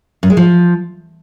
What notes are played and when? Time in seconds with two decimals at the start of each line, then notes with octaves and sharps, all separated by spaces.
0.23 F#2
0.30 G#3
0.37 F3